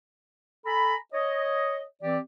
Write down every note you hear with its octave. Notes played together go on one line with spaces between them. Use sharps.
A4 G#5 A#5 B5
C#5 D#5
E3 C4 G4 D5